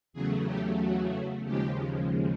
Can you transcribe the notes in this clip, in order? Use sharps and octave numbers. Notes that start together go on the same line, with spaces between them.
E2 C#3 F#3 A3 G#4
G4
F#4
D#2 C#3 F3 G#3 G4